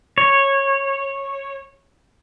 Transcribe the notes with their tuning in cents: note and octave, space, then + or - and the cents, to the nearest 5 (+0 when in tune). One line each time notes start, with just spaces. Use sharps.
C#5 -15